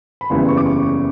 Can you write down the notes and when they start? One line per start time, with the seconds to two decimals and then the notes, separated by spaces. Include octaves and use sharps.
0.21 B5
0.30 F#1 E2 C#3 E3 G3 C6
0.48 C#6
0.57 D6
0.66 C#6